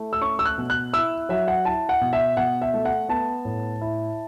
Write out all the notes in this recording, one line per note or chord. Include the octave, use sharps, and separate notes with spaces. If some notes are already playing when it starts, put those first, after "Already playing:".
Already playing: A3 E4
E6
C#4 C#6
E6
F#6
B2
F#6
E4 E6
F#3 E5
F#5
E4 A5
F#5
B2
E5
B2 F#5
E5
A3
F#5
B3 A5
A2
E4